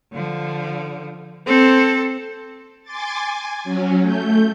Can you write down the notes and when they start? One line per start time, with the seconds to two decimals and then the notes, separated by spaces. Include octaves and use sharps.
0.13 D3 F3
1.47 C4 A4 C5
2.83 G#5 C6 D6 A6
3.22 G#5
3.64 F#3 C#4
4.01 A3 G6